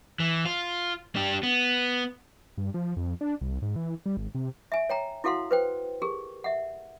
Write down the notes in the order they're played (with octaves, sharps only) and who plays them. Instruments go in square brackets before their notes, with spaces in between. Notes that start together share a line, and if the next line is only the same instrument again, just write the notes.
[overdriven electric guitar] E3
F4
D4 G4
B3
[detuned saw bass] G2
F3
F2
D4
C2
G#2
E3
G3
G#1
C3
[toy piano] E5 G#5
C#5 G5 A#5
E4 F#4 A4 F5 F#5 C6
B4 C5 G5
G4 G#4 A#4
E5 F#5